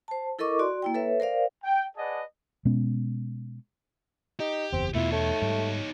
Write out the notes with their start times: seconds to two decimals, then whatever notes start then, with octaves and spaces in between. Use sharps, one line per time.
0.08 C5 A5
0.39 E4 A4 A#4 D#5 C#6 D6
0.59 F#4 D5 C6
0.82 A#3 E4 G5
0.95 A4 B4 C#5 E5
1.20 A#4 C5 D5 F5
1.64 G5
1.97 G#4 B4 D5 D#5 F#5 A5
2.65 B2 G#3 B3 C#4
4.40 D#4 G4
4.73 F#1 E2 C4
4.95 E2 B2 A3 B3 E4 F4
5.12 A3 D#4 C#5
5.42 G#2 G3